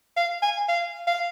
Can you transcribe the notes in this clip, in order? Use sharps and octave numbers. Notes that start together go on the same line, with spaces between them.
F5
G#5
F5
F5